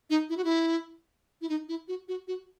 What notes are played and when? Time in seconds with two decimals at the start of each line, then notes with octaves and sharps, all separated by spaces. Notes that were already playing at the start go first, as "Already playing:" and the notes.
0.10 D#4
0.30 E4
0.37 F#4
0.44 E4
1.42 E4
1.49 D#4
1.69 E4
1.88 F#4
2.08 F#4
2.27 F#4